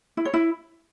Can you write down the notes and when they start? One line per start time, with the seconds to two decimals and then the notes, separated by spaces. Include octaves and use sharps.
0.17 E4
0.25 C#5
0.34 E4